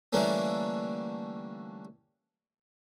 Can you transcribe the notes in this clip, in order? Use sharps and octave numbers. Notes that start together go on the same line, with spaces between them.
D3 E3 G3 A3 A#3 C#4